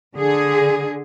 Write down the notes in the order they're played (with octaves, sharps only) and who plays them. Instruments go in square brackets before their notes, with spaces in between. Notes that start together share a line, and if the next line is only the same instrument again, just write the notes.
[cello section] D3 G#4